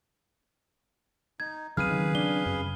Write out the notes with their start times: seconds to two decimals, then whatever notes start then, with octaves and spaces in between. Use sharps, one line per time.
1.40 D#4 G#6
1.77 C#3 F#3 C4 G#4 B4 F5 F6 D#7
1.90 D#3
2.15 D4 G7
2.46 F#2